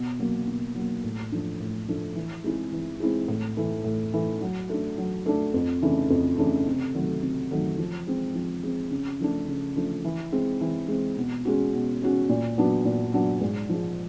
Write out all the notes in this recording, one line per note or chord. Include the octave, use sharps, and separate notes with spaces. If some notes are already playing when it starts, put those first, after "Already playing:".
Already playing: B2
F#3 A#3
B2
F#3 A#3
A2
F3 A3 D4
A2
F3 A3 D4
E3
G#3 C4 E4 G#4
E3
G#3 C4 E4 G#4
A2
E3 A3
A2
E3 A3
F#3
A3 D4
F#3
A3 D4
F2
C#3 E3 A3 D4
F2
C#3 E3 A3 D4
C3
D#3 F#3 A3
C3
D#3 F#3 A3
F3
G#3 C4
F3
G#3 C4
C#3
F3 A3 D4
C#3
F3 A3 D4
E3
G#3 C4
E3
G#3 C4
B2
G#3 C#4 F#4
B2
G#3 C#4 F#4
A#2
F#3 B3 D4 F#4
A#2
F#3 B3 D4 F#4
G#2
F3 G#3